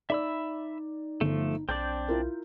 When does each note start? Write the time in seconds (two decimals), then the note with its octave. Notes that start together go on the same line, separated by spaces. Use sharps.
0.10 D#4 D5 E5 B5 E6
1.21 G1 F3 A3
1.69 B1 C4 D4 D5 G6
2.08 E4 F4 A#4